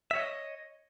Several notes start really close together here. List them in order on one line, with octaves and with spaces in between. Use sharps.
E5 C#5 D#5